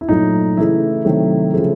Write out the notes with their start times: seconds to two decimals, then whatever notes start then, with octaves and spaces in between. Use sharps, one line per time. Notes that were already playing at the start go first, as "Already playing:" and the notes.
0.01 E4
0.09 A#2 F#3 A3 D#4
0.57 C#3 E3 A3 E4
1.05 C3 D#3 F#3 A3
1.54 C#3 F3 A3